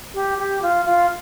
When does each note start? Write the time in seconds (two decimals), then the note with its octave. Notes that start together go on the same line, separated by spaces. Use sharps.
0.14 G4
0.38 G4
0.62 F4
0.85 F4